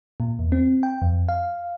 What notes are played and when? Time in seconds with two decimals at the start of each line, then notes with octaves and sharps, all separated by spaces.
0.20 A#2
0.39 E2
0.52 C4
0.83 G5
1.02 F2
1.29 F5